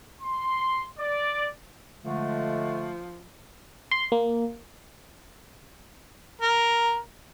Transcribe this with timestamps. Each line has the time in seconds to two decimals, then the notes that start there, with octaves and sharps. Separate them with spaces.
0.21 C6
0.98 D5
2.04 D3 F3 G#3 A3
3.91 C6
4.12 A#3
6.42 A#4